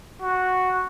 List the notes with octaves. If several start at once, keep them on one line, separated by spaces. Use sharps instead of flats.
F#4